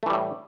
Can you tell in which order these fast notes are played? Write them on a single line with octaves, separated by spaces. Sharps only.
A3 E3 G3 A2